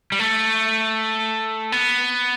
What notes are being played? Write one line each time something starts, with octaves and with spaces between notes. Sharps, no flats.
G3
A3
B3